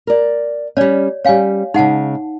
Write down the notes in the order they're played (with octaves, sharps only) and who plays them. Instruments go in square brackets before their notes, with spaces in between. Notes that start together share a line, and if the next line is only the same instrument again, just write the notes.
[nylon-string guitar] A#4 D5
[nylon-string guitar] G3 C#4 [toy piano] C#5 D5
[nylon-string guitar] G3 C#4 [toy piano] C#5 F5 G#5
[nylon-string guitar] C#3 G#3 [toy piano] D#4 F#5 A5